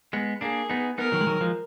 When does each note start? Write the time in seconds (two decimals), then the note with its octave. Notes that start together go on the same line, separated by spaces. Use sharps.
0.13 G#3 B3
0.41 A#3 D4 G#4
0.70 B3 D#4
0.98 B3 D#4 A#4
1.12 D#3 F#3
1.21 G#3
1.26 D#3 F#3
1.41 F3 G#3